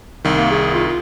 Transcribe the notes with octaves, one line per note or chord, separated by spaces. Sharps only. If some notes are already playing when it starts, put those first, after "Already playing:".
C2 D#3
A#3
G#4
F4
F4